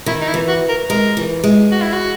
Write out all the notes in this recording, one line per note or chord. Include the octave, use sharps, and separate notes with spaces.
D#3 E4
D#4
E4
E3
F#4
A#4
G#3 A#4
E3
G#3
F#4
E4
F#4